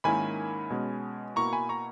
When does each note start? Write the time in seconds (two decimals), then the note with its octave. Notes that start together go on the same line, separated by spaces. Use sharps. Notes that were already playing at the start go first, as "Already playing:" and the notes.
0.04 G#2 D#3 A#3 C#4 E4 G#5 B5
0.70 B2 G#3 C#4
1.36 B2 A#3 E4 A#5 C#6
1.53 G#5 B5
1.69 A#5 C#6